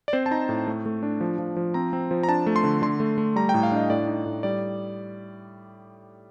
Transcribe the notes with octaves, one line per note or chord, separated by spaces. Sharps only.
D5
C4 C5
A5
D#4 A#5
A2
A3
A3
D4
F3
F3
F3
C4 A#5
C4
F3
A#5
D4 A5
A3
C6
D3
D3 C6
A3
A3
G3 A#5
G5
A2
F5
D4 D#5
A2 D5
D#4
A2
G3 D5